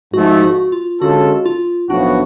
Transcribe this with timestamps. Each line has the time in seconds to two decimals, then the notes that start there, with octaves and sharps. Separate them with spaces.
0.13 G#2 F3 A3 F#4
0.43 F#4
0.72 F4
1.01 D3 G#3 C#4 F4 F#4 A4
1.46 F4
1.90 B1 A2 F3 B3 D4 F#4